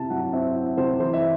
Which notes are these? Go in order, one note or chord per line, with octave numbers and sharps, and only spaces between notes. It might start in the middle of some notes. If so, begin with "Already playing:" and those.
Already playing: C3 E4 A5
F#3 F#5
C4 E5
E4
C3 C5
E3 C5
E5